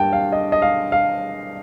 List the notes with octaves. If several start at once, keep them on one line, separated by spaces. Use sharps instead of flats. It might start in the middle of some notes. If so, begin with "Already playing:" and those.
Already playing: G2 G3 A#3 G5 A5
F5
D#5
D#5
F5
F5